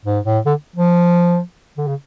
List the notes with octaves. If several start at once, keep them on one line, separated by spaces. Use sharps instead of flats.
G#2
A2
D3
F3
D3
C#3